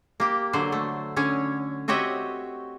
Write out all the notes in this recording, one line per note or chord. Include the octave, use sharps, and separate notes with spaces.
A#3 G4
D3 F#3 C5
A3
D3 C#4 C#5
C4 F#4 G4 C#5 D#5 E5